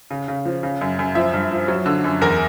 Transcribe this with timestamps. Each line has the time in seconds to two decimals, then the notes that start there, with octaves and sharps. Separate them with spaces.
0.11 C#3
0.28 C#3
0.45 F3
0.63 C#3
0.81 F#2
0.99 F#2
1.15 F3 E5
1.34 G2
1.52 F3
1.68 F#3
1.86 D3
2.04 F#2
2.21 E2 A#4